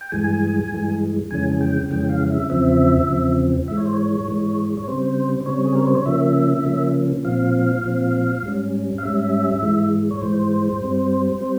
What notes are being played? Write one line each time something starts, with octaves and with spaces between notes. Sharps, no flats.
G5
G2 E3 G#3 G#5
G2 E3 G#3
F2 C#3 E3 G#3 C#4 G#5
G5
F2 C#3 E3 G#3 C#4 G5
G5
F5
E5
E2 C#3 F3 C4 E5
E2 C#3 F3 C4
G#2 E3 G#3 E5
C#5
C5
C#5
G#2 E3 G#3
C#5
C#3 G3 C4 C5
C5
C#3 G3 C4 C#5
G#4
A#4
C5
C#5
C#3 F3 A#3 C#4 E5
C#3 F3 A#3 C#4
A#2 F3 C4 F5
A#2 F3 C4
G#2 G3 C#4
F5
G#2 G3 C#4 E5
G#2 E3 G#3
C#5
G#2 E3 G#3 C5
G2 G3 C4
G3 C4